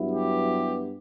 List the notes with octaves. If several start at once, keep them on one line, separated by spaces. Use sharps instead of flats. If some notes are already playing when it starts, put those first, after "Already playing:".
Already playing: G2 F#3 B3 E4
G4